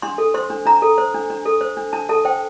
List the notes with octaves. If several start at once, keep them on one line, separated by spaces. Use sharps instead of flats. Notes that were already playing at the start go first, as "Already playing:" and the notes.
D4 C6
A4
C5 C6
D4
D4 A#5
A4
C5
D4
D4
A4
C5
D4
D4 A5
A4 A5
C5 G5